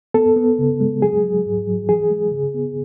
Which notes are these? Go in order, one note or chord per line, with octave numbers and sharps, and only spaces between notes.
B3 A4
B3
C#3
G#3
F#3 G#4
F#3
G#2
F#3
E3 G#4
G#3
C#3
B3